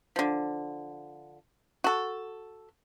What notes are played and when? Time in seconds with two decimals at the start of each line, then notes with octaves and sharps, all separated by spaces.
0.16 D3 F3
1.84 F#4 A4